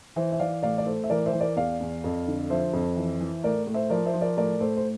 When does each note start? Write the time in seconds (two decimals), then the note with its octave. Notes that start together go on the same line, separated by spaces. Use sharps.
0.16 E3 C5 E5
0.32 E5
0.39 E3 D5 F5
0.63 A2 D5 F5
0.78 D5
0.86 A2 A4 C5
1.04 E5
1.10 E3 A#4 D5
1.26 C5 E5
1.33 E3
1.41 A#4 D5
1.56 E2 D5 F5
1.81 E2
2.04 F2
2.27 D3
2.50 F3 C5 E5
2.73 F2
2.97 E3
3.20 E3
3.44 A2 A#4 D5
3.67 A2
3.74 C5 E5
3.90 F3 A#4 D5
4.06 C5 E5
4.14 F3
4.21 A#4 D5
4.37 A2 A#4 D5
4.60 A2 A4 C5
4.77 C5